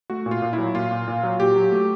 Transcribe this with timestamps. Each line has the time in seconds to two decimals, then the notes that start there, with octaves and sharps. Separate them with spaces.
0.10 A3 F#4
0.26 A#2
0.31 F4
0.42 A#2
0.53 E4
0.58 F#3
0.75 A#2 F4
0.91 A#2
1.08 A#2
1.23 F#3
1.39 A#2 G4
1.56 F#3
1.72 A3